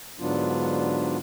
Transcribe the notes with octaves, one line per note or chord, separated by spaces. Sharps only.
G#2 D3 F#3 B3 D4 F4